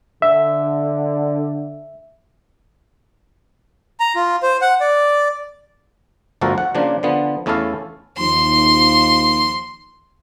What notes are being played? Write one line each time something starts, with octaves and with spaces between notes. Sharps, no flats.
D3 E5
A#5
F4
C5
F#5
D5
G1 D2 F3 F#4 A4 A#4
F#5
C#3 F3 A#3 D4
D3 F3 B3
E2 A3 C#4 E4 A4 F5
D#2 F3 C6